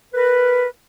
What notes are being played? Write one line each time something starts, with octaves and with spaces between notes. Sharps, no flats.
A#4 B4